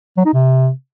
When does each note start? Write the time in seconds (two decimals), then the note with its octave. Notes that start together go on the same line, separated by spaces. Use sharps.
0.17 F#3
0.25 D#4
0.34 C3